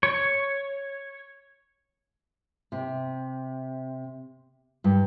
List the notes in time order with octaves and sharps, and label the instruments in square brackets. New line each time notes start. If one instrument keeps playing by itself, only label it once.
[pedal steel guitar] C#5
[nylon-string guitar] C3
G2